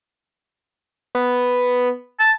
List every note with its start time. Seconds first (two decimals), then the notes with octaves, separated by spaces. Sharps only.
1.15 B3
2.20 A5